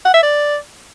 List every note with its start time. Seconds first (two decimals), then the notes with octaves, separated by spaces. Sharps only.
0.05 F#5
0.14 E5
0.23 D5